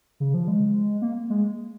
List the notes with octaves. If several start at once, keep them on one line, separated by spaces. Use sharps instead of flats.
C#3
F3
G#3
A#3
G#3